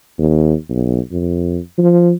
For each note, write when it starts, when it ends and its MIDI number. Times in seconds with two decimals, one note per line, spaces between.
0.18 0.54 39
0.69 1.00 35
1.11 1.58 41
1.78 2.13 53